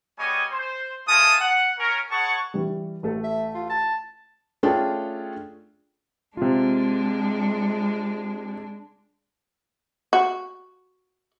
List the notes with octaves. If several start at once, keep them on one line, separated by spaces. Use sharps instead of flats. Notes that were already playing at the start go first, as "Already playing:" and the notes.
G3 B3 G#4 C#5 D#5 G#5
C5
A3 F4 A#4 G#5 A5 D#6
F#5
C#4 A#4
G#4 B4 C#5 F#5 A5 C#6
E3 G3
A1 A3 A4
E5
F4
A5
A3 C#4 D4 F4 G#4 G5
C3 G#3 D4 F4
F#4